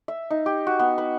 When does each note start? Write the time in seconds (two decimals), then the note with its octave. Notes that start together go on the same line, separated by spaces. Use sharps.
0.08 E5
0.31 D#4
0.46 G4
0.67 F#4
0.79 B3
0.98 B4